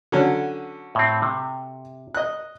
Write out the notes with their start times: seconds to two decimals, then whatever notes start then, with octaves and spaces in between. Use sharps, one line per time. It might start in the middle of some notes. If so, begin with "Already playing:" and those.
0.12 D3 F#3 C#4
0.95 A2 C4
1.22 C3
2.14 D#5 F#6